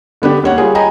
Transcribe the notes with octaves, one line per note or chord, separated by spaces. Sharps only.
D3 B3 D4 G4
D#2 C#5 F#5
G3 F4 G#4
D#5 G5 G#5 A#5 B5